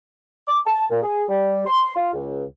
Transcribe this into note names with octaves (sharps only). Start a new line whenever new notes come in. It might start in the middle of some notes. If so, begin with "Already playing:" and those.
D6
A5
A#2
G#4
G3
C6
F4
C#2